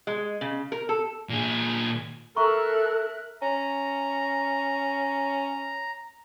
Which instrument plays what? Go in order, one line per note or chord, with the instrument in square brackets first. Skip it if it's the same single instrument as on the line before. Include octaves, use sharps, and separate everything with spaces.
[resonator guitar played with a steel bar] G#3
C#3
A#4
A4
[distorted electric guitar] A#2 G#4
[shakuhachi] A4 [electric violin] A#4 F#6 [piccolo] E5 [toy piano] A#5 C#6
[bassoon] C#4 [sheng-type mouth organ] A#5